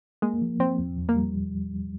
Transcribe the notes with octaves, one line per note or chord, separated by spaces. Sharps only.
G#3 A#3
F3
F3 C4
E2
E2
A#3
G3